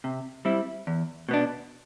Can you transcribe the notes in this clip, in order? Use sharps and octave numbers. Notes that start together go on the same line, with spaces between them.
C3
G3 C4 E4
E2
B2 B3 D4